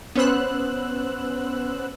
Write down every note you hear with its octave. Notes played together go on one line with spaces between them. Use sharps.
B3 C#4 C5 E6 F#6